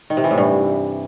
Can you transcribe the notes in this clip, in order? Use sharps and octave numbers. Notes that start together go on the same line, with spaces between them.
D#3
C3
E3
A2
G2